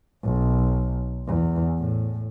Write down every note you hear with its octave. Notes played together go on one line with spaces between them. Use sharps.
B1
E2
A2